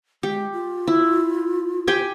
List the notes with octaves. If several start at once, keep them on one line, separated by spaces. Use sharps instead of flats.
G#3 G4
F4
E4
G4 G5 G#5